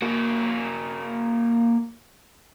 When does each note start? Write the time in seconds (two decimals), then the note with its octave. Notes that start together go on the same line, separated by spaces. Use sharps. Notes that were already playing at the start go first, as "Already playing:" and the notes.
0.02 A#3 F#4